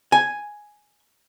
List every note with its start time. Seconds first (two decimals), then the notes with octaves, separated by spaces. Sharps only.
0.12 G#5